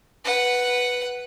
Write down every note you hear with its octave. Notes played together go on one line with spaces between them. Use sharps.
B4 F#5